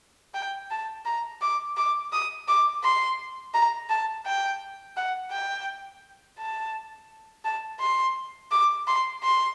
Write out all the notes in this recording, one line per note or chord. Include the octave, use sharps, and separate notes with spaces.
G5
A5
A#5
D6
D6
D#6
D6
C6
A#5
A5
G5
F#5
G5
A5
A5
C6
D6
C6
C6